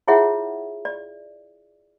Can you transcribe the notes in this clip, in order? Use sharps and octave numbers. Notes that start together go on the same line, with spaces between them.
E4 F4 G#4 C#5 E5 F#5
D5